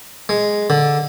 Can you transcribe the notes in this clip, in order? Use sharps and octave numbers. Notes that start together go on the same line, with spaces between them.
G#3
D3